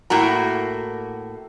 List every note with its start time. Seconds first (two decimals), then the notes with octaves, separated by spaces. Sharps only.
0.10 A2 A#3 F#4 A#5